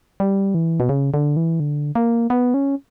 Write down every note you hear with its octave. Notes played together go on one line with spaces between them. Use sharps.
G3
E3
B2
C#3
D3
E3
D3
A#3
B3
C#4